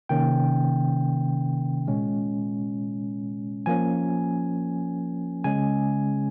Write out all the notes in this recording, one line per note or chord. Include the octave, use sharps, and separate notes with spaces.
C3 D#3 A#3 C#4 G5
A#2 G#3 C#4
F3 A#3 C#4 G#5
C#3 G#3 C#4 G#5